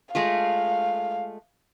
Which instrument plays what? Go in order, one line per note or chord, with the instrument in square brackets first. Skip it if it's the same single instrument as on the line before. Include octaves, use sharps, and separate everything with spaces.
[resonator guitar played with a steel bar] G#3 A3 F4 [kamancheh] F5